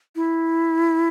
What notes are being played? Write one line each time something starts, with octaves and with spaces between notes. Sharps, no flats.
E4